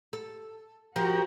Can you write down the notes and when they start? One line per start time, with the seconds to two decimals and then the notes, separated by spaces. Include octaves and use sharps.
0.13 A4
0.96 F3 F#4 G4 A#4